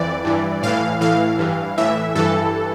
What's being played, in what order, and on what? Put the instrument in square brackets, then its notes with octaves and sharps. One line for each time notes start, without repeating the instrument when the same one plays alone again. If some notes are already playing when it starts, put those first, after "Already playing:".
Already playing: [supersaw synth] F2 E3 D5
G2 E3
A2 E3 F5
A2 E3 F5
G2 E3
A2 E3 E5
G2 E3 A4